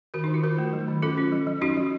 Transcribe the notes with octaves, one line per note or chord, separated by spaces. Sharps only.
D#3 F#4 A#4
D#4
D#3
F4
D#3 F#4 A#4
A3
F#3
D#3
C#4 F4 A4
C#4
F#3
F#3
C#4 D#4 F#4
F#3